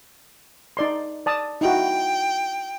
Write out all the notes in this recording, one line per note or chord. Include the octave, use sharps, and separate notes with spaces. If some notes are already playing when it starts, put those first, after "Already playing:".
D#4 D5 C6
D5 A5 D#6
D#4 E4 F#4 G5